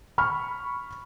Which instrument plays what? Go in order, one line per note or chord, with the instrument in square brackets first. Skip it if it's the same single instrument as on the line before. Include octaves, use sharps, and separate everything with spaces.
[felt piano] B5 C#6 F6